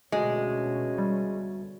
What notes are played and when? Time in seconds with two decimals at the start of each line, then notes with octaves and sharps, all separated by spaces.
0.12 D2 B2 G#3 C#4
0.98 G3